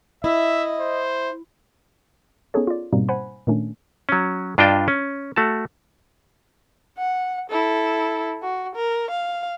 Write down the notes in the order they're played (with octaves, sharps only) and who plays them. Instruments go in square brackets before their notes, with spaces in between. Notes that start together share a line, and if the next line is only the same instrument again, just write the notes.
[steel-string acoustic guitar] E4 [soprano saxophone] D#5 [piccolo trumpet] E5
[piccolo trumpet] C5
[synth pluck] B3 C#4 D#4 G#4 A4 C#5
F4 D5
G#2 B2 G3 A#3 C4 D#4
C5 F#5 G#5 B5
A#2 D#3 A3 C#4 D4
[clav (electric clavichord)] F#3 C#4
G2 D4 F4 D#5 G5 A5
C#4
A3 F#4 A5
[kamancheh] F#5
E4 A4
F#4
A#4
F5